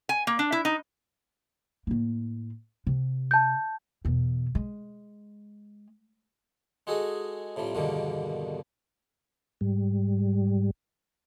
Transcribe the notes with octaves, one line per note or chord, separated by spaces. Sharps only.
G#5
A#3
D4
E4
D#4
A2 A#3
C3
A5 G6
E2 B2
G#3
G#3 F#4 G#4 A4 D#5 D#6
A2 C3 F3 G3
E2 G2 B2 D3 D#3 A#3
G#2 G3